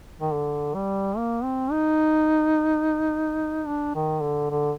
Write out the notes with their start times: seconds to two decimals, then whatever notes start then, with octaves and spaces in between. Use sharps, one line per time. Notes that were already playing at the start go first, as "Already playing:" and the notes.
0.21 D#3
0.33 D3
0.75 G3
1.17 A#3
1.44 C4
1.72 D#4
3.66 D4
3.95 D#3
4.22 D3
4.50 D3